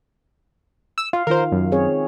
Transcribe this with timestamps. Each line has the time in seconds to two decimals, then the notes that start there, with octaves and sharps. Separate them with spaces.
0.98 E6
1.13 F4 F5
1.27 D#3 F4 A#4 C5
1.52 F#2
1.72 C4 G#4 C#5